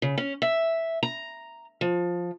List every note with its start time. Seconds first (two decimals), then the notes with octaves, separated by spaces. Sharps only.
0.02 C#3
0.18 C#4
0.42 E5
1.03 A#5
1.81 F3